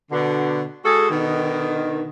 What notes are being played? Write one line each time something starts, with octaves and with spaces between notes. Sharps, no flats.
B2 D3
G#3 F#4 G#4 A4
B2 D3 D#3